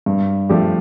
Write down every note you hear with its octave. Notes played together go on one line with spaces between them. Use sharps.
G2
F3 A3 D4 G4